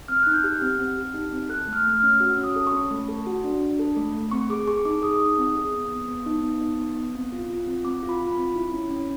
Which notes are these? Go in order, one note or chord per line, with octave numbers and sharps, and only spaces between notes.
C4 F6
D#4 F#6
G6
G4
F6
C4
C4
G4
D#4
C4
A4 F#6
A3
F6
A3
F6
C#4
F#4 E6
C#4
D#6
A4
C#6
C#4
A3
A4
F#4
D4
D4
A4
A3
A3
C4 C#6
G#4 D6
G#4 C#6
D#4 D6
G#4 D#6
D#4
C4
G#4
B3
B3
B3
D#4
B3
D#4
B3
B3
C4
F4
F4
C4
C4 D6
F4
B5
F4
B5
C4
E4
C#4
C#4